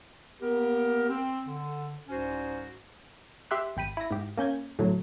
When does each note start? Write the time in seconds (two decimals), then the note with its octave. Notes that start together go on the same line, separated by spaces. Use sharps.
0.42 A#3 B3 G4 A#4
1.09 C4
1.47 D3
2.09 C2 G#2 C#4 F#4 C5
3.51 G4 E5 C6 F#6
3.77 G#1 G5 B5 D#7
3.97 E4 A#6
4.11 G#2 G4
4.37 A#3 C#4 G6 G#6
4.79 A2 D3 F#3